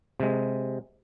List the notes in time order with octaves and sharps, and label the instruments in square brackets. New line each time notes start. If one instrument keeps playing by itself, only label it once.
[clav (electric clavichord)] C3 G#3